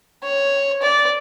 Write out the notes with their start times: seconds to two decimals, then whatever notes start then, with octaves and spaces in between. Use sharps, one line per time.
0.23 C#5
0.82 D5